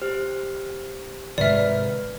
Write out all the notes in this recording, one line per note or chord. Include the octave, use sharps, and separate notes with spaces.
G4 C5 F6
G#2 C3 D#3 B4 D5 E5 F6